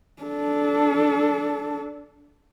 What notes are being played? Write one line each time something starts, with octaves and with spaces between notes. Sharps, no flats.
D4 A4